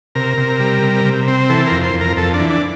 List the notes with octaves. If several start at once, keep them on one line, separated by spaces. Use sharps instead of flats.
C3 A#4
C3
G3
C3
C3
C4
E3 A4
A#4
F2
C5
F2
A#4
F2 A4
D4
E3
D4